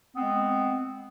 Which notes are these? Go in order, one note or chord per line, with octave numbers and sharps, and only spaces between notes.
G#3 B3 C4